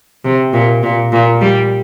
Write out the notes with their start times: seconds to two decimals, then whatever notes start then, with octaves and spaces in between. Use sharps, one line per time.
0.24 C3
0.53 A#2
0.83 A#2
1.12 A#2
1.41 G3